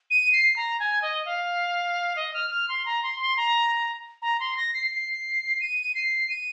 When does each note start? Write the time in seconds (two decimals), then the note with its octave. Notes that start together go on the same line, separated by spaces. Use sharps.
0.10 D#7
0.33 C7
0.56 A#5
0.80 G#5
1.02 D#5
1.26 F5
2.16 D#5
2.34 F6
2.50 F6
2.69 C6
2.86 A#5
3.03 C6
3.20 C6
3.37 A#5
4.22 A#5
4.40 C6
4.57 A#6
4.74 C7
4.91 C7
5.61 D#7
5.95 C7
6.29 D#7